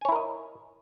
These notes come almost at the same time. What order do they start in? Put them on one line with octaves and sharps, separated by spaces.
G#5 C#5 E4 A#4 D#5